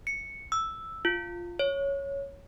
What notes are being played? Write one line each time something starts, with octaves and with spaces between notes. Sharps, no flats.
C#7
E6
F4
C#5